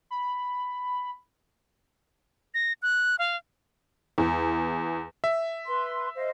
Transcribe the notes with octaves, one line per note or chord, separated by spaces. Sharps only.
B5
A#6
F#6
F5
E2
E5
B4 C6
C5 D#5 F5